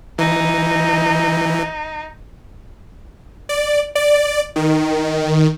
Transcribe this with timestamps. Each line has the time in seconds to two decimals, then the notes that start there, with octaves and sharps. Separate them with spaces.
0.19 E3 D#4
3.49 D5
3.95 D5
4.56 D#3